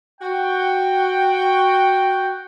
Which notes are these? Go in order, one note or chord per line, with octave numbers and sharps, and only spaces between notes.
F#4 G5